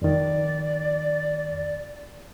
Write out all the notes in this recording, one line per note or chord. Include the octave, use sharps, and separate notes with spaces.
F2 D#3 D5